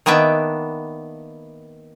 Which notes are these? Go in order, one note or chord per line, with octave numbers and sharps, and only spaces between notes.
D#3 A#3 B3 D4 E5